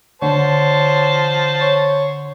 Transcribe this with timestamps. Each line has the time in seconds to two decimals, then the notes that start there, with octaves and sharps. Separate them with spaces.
0.22 D3 C5 C#5 A5
1.61 C#5